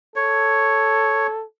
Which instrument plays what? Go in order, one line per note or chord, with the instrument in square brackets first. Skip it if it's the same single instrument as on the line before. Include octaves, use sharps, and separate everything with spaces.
[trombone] A4 [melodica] C#5